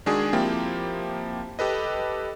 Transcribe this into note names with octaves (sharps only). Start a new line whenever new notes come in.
D#3 G#3 D4 F#4 G#4
F3 A#3 C4 E4 G4
G4 A4 B4 D#5